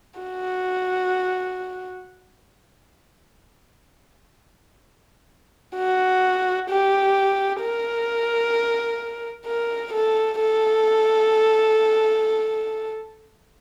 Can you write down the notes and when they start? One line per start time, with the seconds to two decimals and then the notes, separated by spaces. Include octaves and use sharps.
0.20 F#4
5.76 F#4
6.69 G4
7.61 A#4
9.46 A#4
9.93 A4
10.40 A4